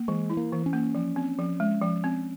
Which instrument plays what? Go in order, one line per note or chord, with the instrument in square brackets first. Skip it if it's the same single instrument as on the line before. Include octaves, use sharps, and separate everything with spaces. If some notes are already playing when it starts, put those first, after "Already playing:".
Already playing: [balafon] A#3
[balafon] E3 [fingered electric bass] G#3
[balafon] E4
[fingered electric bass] A#3
[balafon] E3
[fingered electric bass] C#4
[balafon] A#3
F3
C4
F3
G#3
F3
C4